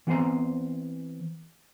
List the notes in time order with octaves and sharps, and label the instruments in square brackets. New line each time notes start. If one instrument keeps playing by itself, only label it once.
[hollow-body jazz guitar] E3 B3 C4 C5 A#5